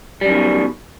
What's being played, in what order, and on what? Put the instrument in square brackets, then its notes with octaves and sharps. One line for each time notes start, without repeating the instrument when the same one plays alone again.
[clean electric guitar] G3
F#2
D#3
B2